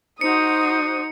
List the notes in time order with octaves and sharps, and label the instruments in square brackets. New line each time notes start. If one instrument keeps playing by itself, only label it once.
[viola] D#4 [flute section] F#4 C5 [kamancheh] D#6 [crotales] C#7